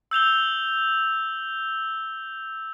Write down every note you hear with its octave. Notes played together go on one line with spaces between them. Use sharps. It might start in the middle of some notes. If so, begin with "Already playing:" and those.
E6 G6 F7 G7